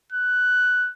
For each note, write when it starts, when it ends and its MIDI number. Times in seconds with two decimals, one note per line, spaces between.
0.12 0.90 90